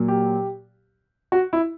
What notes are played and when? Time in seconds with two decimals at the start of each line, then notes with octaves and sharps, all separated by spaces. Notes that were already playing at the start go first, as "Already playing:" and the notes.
Already playing: A#2 F#3 A#3
0.08 G4
1.32 F#4
1.53 E4